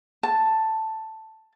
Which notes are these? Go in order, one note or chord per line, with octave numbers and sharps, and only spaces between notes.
A5